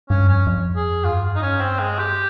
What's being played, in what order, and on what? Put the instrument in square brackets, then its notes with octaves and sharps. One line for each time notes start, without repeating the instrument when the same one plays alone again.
[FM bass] G2 [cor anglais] C#4
[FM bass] F2 [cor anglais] C#4
[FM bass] F2
[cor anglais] G#4
[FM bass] G2 [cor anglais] F4
[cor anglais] D#4
C#4
C4
G#3
G4